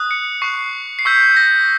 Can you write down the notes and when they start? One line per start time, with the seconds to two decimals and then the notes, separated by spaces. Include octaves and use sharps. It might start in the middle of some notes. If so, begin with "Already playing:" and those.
Already playing: D#6 F#6
0.11 C#7
0.42 C#6 F#6 C7
0.99 C7
1.05 C#6 E6 G6 B6
1.37 A#6